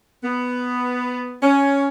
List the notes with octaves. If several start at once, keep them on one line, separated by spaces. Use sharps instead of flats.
B3
C#4